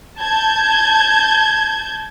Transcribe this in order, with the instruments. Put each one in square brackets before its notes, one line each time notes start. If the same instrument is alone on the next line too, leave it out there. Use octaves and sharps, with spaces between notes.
[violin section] A5 G6 G#6